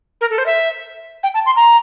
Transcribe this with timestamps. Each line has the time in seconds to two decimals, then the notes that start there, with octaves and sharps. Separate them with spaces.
0.21 A#4
0.30 A4
0.38 C5
0.46 E5
1.23 G5
1.34 A5
1.46 C6
1.56 A#5